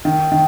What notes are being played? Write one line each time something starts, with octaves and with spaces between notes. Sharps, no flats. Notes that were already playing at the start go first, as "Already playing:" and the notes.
D#3
D#3